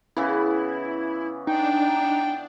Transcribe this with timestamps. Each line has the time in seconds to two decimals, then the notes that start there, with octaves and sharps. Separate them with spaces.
0.17 C#3 E3 B3 E4
1.47 D4 D#4 G5